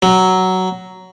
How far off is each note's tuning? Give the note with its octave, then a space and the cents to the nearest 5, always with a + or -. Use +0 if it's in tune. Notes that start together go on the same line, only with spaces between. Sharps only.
F#3 +10